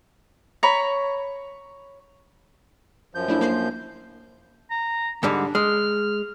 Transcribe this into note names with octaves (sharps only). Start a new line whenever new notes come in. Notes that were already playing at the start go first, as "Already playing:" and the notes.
C#5 A#5 B5
F#2 F3 G6
A3 D4 E4
A#3 C5 C7
A#5
G#2 D3 G3 D4
G#3 F6